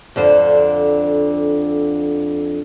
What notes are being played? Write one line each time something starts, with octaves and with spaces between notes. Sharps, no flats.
F2 D3 C5